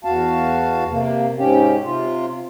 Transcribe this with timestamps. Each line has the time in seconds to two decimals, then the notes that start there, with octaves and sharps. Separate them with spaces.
0.04 E2 F#4 F5 A5
0.90 C3 A#3
1.37 G#2 C#4 G4
1.83 C3 F4